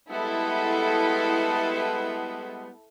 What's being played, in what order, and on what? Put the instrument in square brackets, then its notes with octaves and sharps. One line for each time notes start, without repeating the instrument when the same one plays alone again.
[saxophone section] G3 G#3 B3 [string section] E4 A4